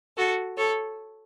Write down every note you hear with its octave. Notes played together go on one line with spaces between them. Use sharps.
F#4 A4
A4 C#5